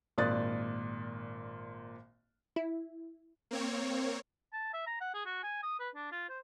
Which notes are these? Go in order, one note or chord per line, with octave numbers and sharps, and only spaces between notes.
G#1 A#2 D5 D#6 F#6 A6
E4
A#3 C4 C#5
A5
E5
A#5
F#5
G#4
F#4
G#5
D#6
B4
D4
F4
C5